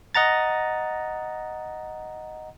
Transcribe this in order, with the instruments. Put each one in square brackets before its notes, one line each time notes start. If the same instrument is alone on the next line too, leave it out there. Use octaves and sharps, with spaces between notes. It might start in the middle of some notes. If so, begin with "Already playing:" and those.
[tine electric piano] D#5 F#5 A#5 A6